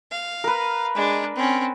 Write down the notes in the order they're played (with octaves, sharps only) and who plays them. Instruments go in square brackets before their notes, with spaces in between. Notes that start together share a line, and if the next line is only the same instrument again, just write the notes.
[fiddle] F5
[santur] A#4 B4
[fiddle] G#3 D4
C4 C#4